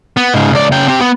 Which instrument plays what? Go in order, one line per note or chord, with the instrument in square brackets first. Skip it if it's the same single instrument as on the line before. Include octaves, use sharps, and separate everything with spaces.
[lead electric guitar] B3
G#2 C#3
C#2 D5
C#3 G5
C4 G4
B3